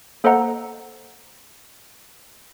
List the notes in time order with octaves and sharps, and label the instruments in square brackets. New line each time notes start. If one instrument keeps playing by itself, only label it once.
[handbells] A#3 A4 C5 D#5 F#5 A#5